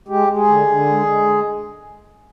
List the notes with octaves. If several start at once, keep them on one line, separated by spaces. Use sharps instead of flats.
G#3 G4
G#3
G#4
D3
D3
G#3
G#3